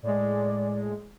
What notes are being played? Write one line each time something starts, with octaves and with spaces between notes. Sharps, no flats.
A2 G#3 D5